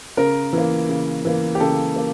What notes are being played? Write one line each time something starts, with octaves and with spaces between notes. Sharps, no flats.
C#3 A#4
E3 A#3
C#3
E3 A#3
G4
C#3 A4
A#3